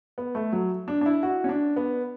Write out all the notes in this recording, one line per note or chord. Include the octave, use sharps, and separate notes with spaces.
B3
A3
F#3
D4
D4
E4
F#4
C#4
D4
B3